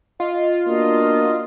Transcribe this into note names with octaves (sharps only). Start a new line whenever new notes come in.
F4 D#5
A#3 B3 D4 F#4 D#5